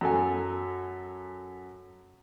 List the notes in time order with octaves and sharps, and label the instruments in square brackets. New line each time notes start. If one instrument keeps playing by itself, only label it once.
[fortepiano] F#2 A4 G#5